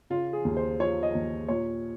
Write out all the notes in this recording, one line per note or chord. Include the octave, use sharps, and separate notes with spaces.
C#3 F4
G#4
D#2
C5
F3 C#5
D#5
D#2
A#2 C#5